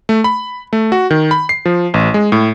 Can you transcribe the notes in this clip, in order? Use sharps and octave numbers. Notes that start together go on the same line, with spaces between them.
A3
B5
A3
F#4
D#3
B5
C7
F3
A1
G#3
A2